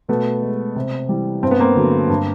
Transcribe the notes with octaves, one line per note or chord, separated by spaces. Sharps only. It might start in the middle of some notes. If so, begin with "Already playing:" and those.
B2 A3 B3
G#3
C3
E3 G3
G2 C4
B3
A#3 C4
D3 F#3 A3
G2